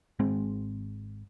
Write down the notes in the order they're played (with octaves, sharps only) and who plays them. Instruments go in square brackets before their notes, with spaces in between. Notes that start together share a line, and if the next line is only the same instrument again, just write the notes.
[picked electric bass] G#1 G#3 C4